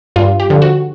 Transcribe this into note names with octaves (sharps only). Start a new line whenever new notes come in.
G2 F4
G4
D3 F3
F#4